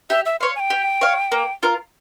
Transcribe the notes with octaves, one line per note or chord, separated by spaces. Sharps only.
G4 E5
E5
C#5 F5 C6
G#5
G5
G4
C#5 F5
A#3
F4 A#4